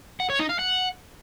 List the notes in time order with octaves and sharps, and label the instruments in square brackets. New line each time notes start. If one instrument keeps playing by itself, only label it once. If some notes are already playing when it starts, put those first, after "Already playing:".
[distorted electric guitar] F#5
C#5
D#4
F5
F#5